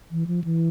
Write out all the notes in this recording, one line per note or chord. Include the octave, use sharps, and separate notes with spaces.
E3
F3
E3